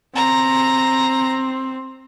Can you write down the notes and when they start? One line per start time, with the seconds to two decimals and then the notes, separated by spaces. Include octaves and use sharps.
0.15 C4 A#5